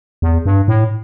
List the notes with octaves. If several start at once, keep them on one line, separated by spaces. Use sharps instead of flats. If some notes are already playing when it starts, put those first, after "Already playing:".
E2
G2
A2